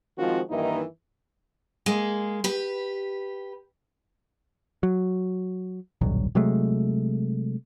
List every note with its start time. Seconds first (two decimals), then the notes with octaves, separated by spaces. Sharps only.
0.18 D#3 F3 G#3 C4 F4 F#4
0.50 G2 D#3 E3 A#3 D#4 E4
1.86 G#3 A#3
2.44 G4 B4
4.83 F#3
6.01 D#1 B1 G2 F#3
6.35 C3 F#3 G#3 A3